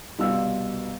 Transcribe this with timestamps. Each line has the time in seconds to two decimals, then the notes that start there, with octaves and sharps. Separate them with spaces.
0.19 C2 B2 F4 E6